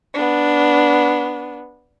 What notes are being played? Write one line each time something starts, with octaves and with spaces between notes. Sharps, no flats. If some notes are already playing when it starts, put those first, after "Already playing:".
B3 D4